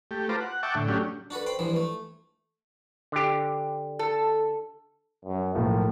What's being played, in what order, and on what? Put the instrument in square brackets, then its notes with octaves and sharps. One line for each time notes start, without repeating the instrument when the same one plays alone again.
[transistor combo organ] A3 G4
F4 B4 C5 A5 A#5 D6
F#5
E5 F#5 G5 A5 C#6 D6
A2 D3
F#3 A3 C#4 D4 G4
[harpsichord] D4 F#4 A4 B4
C5 G5 B5
G2 E3 F3
A3
[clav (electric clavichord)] D3 G4
[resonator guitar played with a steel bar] A4
[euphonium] F#2
[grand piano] B1 A2 F3 [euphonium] A#3